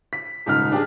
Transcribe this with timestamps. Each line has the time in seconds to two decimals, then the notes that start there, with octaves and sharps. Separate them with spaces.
0.13 B6
0.46 D#1 G#2 C#3 F6
0.72 D4 G4 G#4